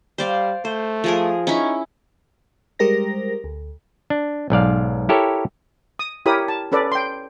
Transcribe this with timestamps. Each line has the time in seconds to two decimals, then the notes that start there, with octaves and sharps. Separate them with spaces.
0.18 G3 C5 D5 F5
0.65 A3 C5
1.04 F3 G#4 A#4
1.47 C#4 D#4 E4
2.79 G3 G#3 G4 A#4 C5 A#6
3.44 D2
4.10 D4
4.50 B1 G#2 D5 F5
5.09 E4 G4 A4 A#4 C#5
5.99 D#6
6.26 E4 G4 A#4 C#5 B5 D#6
6.48 A5
6.72 C#4 A4 B4 D5
6.92 G5 C6